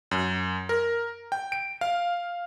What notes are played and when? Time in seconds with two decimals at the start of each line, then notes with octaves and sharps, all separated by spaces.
0.11 F#2
0.69 A#4
1.32 G5
1.52 D7
1.81 F5